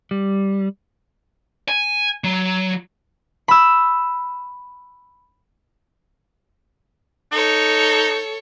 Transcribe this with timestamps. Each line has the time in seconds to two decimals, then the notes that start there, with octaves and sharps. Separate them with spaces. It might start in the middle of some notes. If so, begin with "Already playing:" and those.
0.11 G3
1.68 G#5
2.24 F#3
3.48 B5 E6
7.32 D#4 A4 C#5